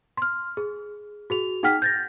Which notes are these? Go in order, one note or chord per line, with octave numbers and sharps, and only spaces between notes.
C6 F6
G#4
F#4 G#4 F7
D#4 G#4 F#5 G5 F6 B6
G6 A6 A#6